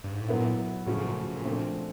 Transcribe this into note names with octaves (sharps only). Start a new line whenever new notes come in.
G2
G#2
A2
A#2 F#3 B3 E4
A2 C#3 F3 A3 C#4 F#4
G#2
A#2
A2
A#2
D3 F3 A3 C4